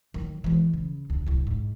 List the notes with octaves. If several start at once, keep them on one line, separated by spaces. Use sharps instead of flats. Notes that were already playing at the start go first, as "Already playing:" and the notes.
D#3 F#3
E3 G#3
C#3
D2 D3
D1 C2
G#2